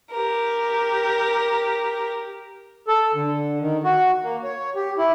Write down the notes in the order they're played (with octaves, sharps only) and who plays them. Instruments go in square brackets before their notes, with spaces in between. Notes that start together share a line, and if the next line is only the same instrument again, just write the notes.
[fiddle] G4 A#4
[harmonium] A4
D3
D#3
F#4
A#3
C#5
G4
E4